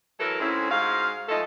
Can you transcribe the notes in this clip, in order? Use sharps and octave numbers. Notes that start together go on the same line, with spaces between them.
E3 F#3 E4 A4 A#4
G#2 G#3 A3 C4 C#4 E4
G#2 G#3 F#4 F5
F3 G#3 A3 A4 D#5